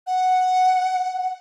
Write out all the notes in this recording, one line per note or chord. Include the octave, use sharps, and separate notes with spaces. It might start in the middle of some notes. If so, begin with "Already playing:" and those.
F#5